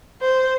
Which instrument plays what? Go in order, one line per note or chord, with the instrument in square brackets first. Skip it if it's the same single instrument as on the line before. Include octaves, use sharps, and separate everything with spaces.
[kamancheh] C5